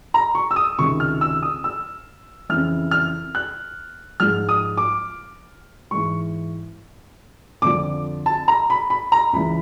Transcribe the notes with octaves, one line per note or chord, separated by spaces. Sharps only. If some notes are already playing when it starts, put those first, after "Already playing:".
A#5
C#6
E6
D#6
C#2 C3 D#3 C#6
F6
E6
D#6
E6
F2 C#3 E3 F6
F6
F#6
G#2 F3 F6
D#6
D6
G#2 E3 C#6
F2 D3 F3 D6
A5
A#5
B5
B5
A#5
C#2 C#3 E3 B5